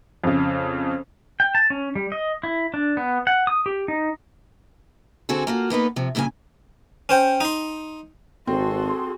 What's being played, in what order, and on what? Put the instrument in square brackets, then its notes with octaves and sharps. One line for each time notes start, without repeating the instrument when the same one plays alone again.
[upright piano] F2 C#3
[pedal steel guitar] G5
A5
C#4
G3
D#5
E4
D4
B3
F#5
D#6
G4
D#4
[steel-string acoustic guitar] D3 C4 F#4 G#4 A4
A#3 F4 F#4
A#3 B3 D#4 B4
C3 F3
G2 A#2 C#3 F4 G#5
[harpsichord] C#4 C5 G5
D#4 C6
[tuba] G#1 [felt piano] C4 [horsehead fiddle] F#4 G#4 [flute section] A4 C6